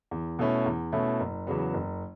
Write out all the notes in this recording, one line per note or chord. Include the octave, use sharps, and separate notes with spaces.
E2
B2 A3 C#4 E4
E2
B2 A3 C#4 E4
F#1
E2 C#3 F#3 B3
F#1